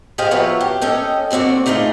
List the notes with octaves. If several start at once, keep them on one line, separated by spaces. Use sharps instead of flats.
G4 G#4 C5 D#5 F5 G5
F3 F#3 B3 F4 C#5 E5
G4
C#4 A4 D#5 G5
D#2 D3 C4 F#4 D5
D3 A3 D#4 F4 G#4